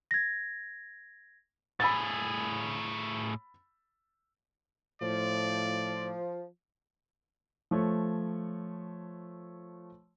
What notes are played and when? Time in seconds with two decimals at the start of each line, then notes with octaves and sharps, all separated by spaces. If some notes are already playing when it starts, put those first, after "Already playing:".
0.11 G#6 A#6
1.80 A2 G#4 B5 E6 A6
5.02 A2 F3 D5
7.71 F3 A3 C#5